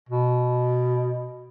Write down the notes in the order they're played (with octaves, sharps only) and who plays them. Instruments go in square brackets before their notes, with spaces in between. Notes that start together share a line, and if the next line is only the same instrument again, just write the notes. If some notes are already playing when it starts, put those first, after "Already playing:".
[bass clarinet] B2